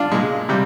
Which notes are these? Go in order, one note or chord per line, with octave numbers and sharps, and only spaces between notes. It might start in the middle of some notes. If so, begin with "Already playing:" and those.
Already playing: D4 F4
A#2 G#3
C3 G3